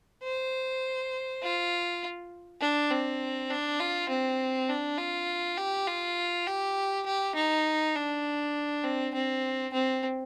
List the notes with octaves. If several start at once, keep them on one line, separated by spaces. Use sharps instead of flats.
C5
F4
D4
C4
D4
F4
C4
D4
F4
G4
F4
G4
G4
D#4
D4
C4
C4
C4